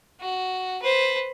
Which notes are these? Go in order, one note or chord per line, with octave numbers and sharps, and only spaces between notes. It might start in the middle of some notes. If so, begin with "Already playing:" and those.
F#4
B4 C5